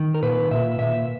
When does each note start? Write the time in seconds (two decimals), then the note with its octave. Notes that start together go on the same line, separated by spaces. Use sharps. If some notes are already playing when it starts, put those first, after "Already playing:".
Already playing: D#3
0.14 A#4
0.22 A#2 B4
0.51 A#2 E5
0.79 A#2 E5